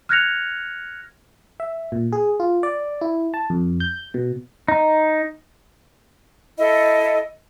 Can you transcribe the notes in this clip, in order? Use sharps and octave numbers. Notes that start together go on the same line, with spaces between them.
F6 F#6 G#6 A#6 C#7 F7
E5
A#2
G#4
F4
D5
E4
A5
F2
G6
B2
D#4
E4 A4 D#5